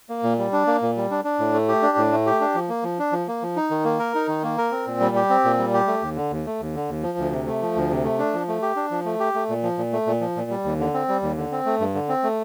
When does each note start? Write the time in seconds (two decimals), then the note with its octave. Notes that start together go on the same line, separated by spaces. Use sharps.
0.09 A#3
0.23 A#2
0.39 G3
0.53 D4
0.67 A#3
0.82 A#2
0.97 G3
1.11 D4
1.24 D4
1.39 A2
1.53 A3
1.69 G4
1.82 D4
1.97 A2
2.12 A3
2.26 G4
2.41 D4
2.55 F3
2.69 A#3
2.83 F3
2.99 D4
3.12 F3
3.28 A#3
3.42 F3
3.56 D#4
3.71 D#3
3.85 A#3
3.99 A#4
4.15 D#4
4.28 D#3
4.43 A#3
4.58 A#4
4.71 C4
4.87 A#2
5.00 G3
5.16 G4
5.30 C4
5.44 A#2
5.59 G3
5.74 G4
5.87 A3
6.02 D#2
6.16 D3
6.31 D#2
6.46 A3
6.60 D#2
6.75 D3
6.89 D#2
7.03 F3
7.18 D2
7.32 C3
7.47 A3
7.62 F3
7.76 D2
7.90 C3
8.04 A3
8.19 D4
8.34 F3
8.48 A3
8.62 G4
8.76 D4
8.91 F3
9.05 A3
9.20 G4
9.35 A3
9.49 A#2
9.63 F3
9.78 A#2
9.93 A3
10.07 A#2
10.21 F3
10.36 A#2
10.50 G3
10.64 D#2
10.80 D3
10.94 C4
11.09 G3
11.22 D#2
11.37 D3
11.52 C4
11.66 A3
11.80 G2
11.94 D3
12.09 C4
12.23 A3